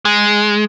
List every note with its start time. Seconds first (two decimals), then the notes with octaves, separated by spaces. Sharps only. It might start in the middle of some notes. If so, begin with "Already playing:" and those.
0.05 G#3